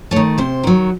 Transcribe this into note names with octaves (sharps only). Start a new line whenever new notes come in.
A3 C#5
D#3
C3 C5
D#3 F#3